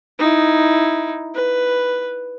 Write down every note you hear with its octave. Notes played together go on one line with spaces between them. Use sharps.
D#4 E4
B4